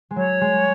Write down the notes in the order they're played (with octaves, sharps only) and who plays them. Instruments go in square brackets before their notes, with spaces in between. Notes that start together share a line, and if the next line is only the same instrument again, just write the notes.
[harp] G#3
[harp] F#3 [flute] C#5
[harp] G#3